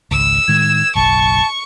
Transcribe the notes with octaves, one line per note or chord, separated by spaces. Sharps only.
G#1 C#2 E6
A2 D#3 G#3 G#6
F#1 B1 A5 C#6